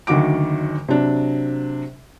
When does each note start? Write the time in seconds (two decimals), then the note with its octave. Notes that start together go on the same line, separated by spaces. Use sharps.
0.07 F#1 D2 D#3 F#4 D6 D7
0.88 C3 F#3 D4